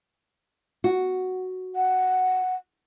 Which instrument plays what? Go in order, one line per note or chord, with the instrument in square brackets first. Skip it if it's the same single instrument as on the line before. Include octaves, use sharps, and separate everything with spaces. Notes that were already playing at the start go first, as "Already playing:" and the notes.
[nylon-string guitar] F#4
[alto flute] F#5